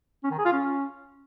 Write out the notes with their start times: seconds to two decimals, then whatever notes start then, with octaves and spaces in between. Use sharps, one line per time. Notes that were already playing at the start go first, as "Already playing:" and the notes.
0.24 C#4
0.31 D#3
0.38 G#4
0.45 F4
0.53 C#4